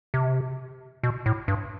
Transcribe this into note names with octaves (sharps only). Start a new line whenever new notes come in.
C3
B2
A2
G2